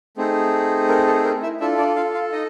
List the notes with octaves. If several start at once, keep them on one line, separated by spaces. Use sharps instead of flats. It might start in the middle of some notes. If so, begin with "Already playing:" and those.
A3 C4 D#4 G#4
A#4
A4
A#4
E4 E5
D4 E4 F4 A4 E5
D4 D5
F4 F5
F4 F5
D#4 D#5